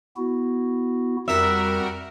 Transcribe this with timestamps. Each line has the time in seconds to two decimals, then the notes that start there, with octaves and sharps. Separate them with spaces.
0.17 B3 E4 F#4
1.28 F2 G3 F#4 A#4 E5